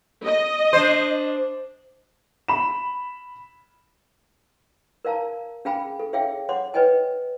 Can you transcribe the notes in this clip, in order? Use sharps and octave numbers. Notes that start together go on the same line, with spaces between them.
D#5
D4 C5
B5 E7
A#4 D5 F5 A5 A#5
C#4 G#4 F5 G5 G#5 B5
A4
G#4 C#5 E5 F5 G5
C#5 F#5 C6 D6
B4 C#5 D#5 G5 G#5